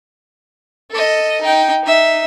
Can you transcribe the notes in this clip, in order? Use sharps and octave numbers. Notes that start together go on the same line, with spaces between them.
A4 D#5
D#4 G5
D#4 E5